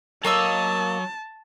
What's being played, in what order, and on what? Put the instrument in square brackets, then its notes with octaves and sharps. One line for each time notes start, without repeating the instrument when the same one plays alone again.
[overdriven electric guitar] F#3 [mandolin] A#3 D#5 E6 [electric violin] A5